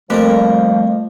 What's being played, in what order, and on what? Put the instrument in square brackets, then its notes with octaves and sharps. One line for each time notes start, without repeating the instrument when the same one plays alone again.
[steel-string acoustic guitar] F2 [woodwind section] F3 G3 [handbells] A3 [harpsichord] A#3 A4 A#4